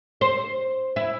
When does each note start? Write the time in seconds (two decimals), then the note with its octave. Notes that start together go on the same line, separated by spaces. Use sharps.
0.21 C5
0.96 E4